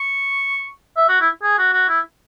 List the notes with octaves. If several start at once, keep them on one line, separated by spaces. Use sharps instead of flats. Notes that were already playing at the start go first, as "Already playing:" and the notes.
Already playing: C#6
E5
F#4
E4
G#4
F#4
F#4
E4